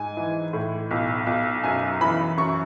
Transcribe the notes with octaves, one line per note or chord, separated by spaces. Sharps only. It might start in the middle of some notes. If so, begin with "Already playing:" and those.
Already playing: G#2 G#5
E3
A2
B1
B1
F#2 G#5
E3 B5
F#2 C#6